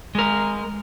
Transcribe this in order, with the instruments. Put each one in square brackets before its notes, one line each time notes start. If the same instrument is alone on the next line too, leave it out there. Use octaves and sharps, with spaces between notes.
[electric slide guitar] G#3 A#4